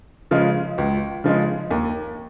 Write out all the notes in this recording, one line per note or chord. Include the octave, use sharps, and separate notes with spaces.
C#3 F3 G#3
C#2
C#3 F3 G#3
D#2